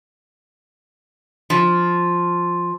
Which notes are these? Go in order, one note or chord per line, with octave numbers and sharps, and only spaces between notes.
F3